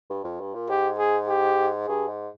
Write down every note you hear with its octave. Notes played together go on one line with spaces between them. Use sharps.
G2
F2
G2
A#2
G#2 G4
G#4
G4
G2 G#4
G#2